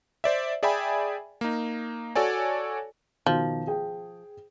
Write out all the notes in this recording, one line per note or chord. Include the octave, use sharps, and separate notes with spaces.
C5 D5 E5
G#4 D5 E5 G5 G#5 B5
A#3 D#4
F#4 A4 C#5 D5 G#5
B2 D#3 F3
G#4 G5